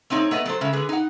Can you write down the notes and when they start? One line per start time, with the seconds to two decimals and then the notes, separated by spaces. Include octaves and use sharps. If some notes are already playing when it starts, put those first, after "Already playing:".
0.10 A3 C4 D#4 C#5
0.31 A3 B3 D#5
0.46 F#3 A4 C5
0.61 C#3 G#3 E5
0.73 D3 G#4 B4
0.89 D#4 F#5